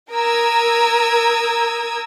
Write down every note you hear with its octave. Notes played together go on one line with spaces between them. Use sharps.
A#4 A#5 D#6 E6 G#6